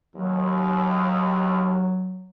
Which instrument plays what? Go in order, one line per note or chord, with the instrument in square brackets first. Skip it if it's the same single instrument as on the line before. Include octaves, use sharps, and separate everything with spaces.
[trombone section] D#2 [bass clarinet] F#3